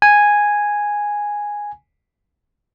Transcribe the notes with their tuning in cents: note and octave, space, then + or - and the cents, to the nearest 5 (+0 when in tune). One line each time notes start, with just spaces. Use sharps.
G#5 -5